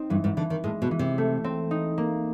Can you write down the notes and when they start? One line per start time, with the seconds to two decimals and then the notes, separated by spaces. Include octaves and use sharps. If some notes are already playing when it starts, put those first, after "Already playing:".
Already playing: C4 D#4
0.10 G2 E3
0.24 G#2
0.37 D3 E3
0.50 D#3
0.64 A2 G#3
0.82 B2
0.91 E3
0.99 C3
1.18 A3
1.44 C4
1.71 D#4
1.98 A#3